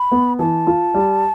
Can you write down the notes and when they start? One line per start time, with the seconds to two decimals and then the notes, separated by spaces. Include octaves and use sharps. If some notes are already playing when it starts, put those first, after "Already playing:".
Already playing: B5
0.12 B3
0.39 E3 A5
0.67 F4
0.94 G3